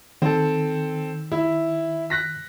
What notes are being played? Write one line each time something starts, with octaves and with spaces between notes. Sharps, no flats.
D#3 C4 A4
E4
F#6 A#6 B6